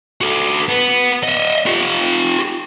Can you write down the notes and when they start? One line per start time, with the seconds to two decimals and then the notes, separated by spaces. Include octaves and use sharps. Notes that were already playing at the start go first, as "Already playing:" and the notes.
0.21 F#4 A4
0.69 B3
1.23 D#5 E5
1.66 F4 G4